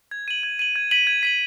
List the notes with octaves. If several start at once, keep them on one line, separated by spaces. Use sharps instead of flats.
G#6
D#7 F#7
G#6
D#7 F#7
G#6
B6 D#7 F#7
G#6
B6 D#7 F#7